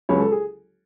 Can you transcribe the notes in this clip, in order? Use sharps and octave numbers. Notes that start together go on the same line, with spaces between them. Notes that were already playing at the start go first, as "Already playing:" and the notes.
C#2 C#3 F#3 C#5
A4
G#4